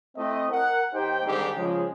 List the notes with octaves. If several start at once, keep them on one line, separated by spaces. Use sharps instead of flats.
A3 C4 E4 D#5
A#4 F#5
D#2 D#4 G4 C5 G5
G#2 D3 D#3 G3 C4 G4
C#3 F3 G#3